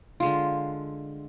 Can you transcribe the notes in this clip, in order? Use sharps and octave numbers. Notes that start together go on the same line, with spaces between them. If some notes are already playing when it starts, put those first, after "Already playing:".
D3 G#3 F4